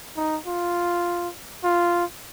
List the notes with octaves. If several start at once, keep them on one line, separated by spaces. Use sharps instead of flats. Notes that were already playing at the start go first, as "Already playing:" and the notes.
D#4
F4
F4